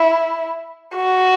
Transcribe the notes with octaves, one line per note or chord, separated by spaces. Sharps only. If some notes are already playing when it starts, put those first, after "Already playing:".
Already playing: E4
F#4